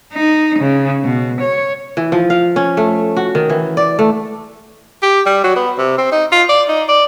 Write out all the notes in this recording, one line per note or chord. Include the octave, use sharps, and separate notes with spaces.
D#4
C#3
B2
C#5
E3
F3
F5
C#4
A3
F#4
D#3
E3
D5
A3
G4
G3
F#3
B3
C3
C4
D#4
F4
D5
D#4
D5